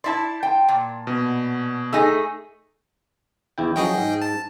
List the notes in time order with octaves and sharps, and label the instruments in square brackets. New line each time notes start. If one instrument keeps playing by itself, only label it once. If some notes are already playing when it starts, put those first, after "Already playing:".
[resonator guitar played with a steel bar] E4 D5 [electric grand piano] A5 C6
[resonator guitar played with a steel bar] G5
A#2
[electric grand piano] B2
[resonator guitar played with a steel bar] A3 D#4 G#4 [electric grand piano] E6 A#6
[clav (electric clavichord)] E2 E4 G5
[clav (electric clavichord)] F3 F#3 C#4 [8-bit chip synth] G#4 D#5 G5
[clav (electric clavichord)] G#2
[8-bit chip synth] A5